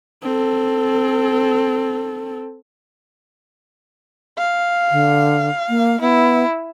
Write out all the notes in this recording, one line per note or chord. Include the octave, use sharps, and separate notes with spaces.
C4 A4
F5
D3
A#3
B3 E4